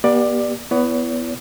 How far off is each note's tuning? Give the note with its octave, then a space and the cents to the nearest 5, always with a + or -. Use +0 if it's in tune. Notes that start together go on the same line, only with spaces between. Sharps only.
B3 -40 G4 +0 D5 +15
B3 +10 E4 +20 C#5 +45